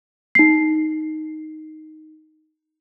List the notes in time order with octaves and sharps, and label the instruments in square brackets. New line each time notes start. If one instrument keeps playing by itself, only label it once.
[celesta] D#4 C7